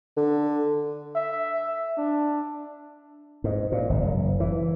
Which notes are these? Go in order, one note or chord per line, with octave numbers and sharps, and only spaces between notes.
D3
E5
D4
G#2
A#2
G#1
F#1
E3